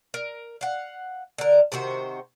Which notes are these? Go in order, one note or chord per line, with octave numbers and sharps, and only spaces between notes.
A#4
F5 F#5
D3 A#4
C3 D#3 F#4 C5